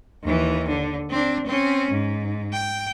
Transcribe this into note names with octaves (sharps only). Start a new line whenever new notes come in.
D#2 E3
D3
C4 D4
C4 C#4
G#2
G5